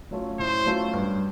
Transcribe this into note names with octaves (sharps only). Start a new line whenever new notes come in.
F#3 A3 C#4 F4
A2 C5
F#3 A3 C#4 F4
G2